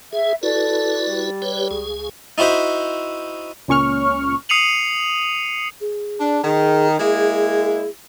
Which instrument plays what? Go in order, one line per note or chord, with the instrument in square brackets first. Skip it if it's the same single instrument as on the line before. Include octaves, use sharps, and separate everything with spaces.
[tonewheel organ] G#4 [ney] E5
[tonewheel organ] E4 F#4 B4 [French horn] A4 [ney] D5
[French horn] G3
[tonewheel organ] G4 B4 C#5
C#2 G#4
[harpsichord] D#4 E4 F#4 C5 E5
[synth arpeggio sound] C#2 A#2 C#4 C#6 F6
[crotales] D#6 C7 C#7 D#7 F7 F#7
[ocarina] G#4
[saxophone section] D4
[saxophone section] D#3 [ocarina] G#4
[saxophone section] G#3 A#3 E4 [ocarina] G#4